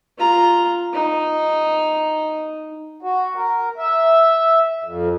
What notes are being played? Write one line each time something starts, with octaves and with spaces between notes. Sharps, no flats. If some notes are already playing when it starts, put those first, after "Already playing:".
F4 A#5
D#4
F#4
A#4
E5
F2